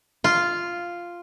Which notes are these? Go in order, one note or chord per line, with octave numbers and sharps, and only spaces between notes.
F4